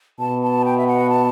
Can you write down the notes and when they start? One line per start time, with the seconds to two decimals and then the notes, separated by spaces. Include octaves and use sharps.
0.19 B2 A5
0.42 A5
0.65 G5
0.77 E5
0.87 F#5
1.10 A5